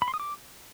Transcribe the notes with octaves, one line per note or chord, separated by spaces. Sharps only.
B5
C6
D#6
D6